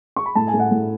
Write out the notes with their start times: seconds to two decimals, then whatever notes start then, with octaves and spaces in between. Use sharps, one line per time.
0.16 C#6
0.26 B5
0.35 A2 A5
0.47 G#5
0.54 A2
0.59 F#5
0.71 A2